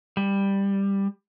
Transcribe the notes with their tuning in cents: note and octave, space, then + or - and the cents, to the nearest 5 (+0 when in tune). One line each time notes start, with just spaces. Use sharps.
G3 +10